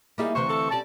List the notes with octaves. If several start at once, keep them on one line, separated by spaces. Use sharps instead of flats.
G3 A#3 D#4 E4 G#4
D2 C3 E3 C5 C#6
C4 A4
G3 C#4 A4 D5 A5